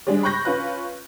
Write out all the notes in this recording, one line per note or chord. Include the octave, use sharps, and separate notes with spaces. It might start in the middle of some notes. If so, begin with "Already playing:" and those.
G3 G#3 D4
B5 C#6 F#6 G6 A#6
C#4 F4 B4 F#6